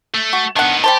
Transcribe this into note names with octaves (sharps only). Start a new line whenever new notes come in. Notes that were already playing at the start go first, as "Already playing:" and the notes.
A3
F#4
D#3 B3 D4 F#5
G3 G4 C5 A5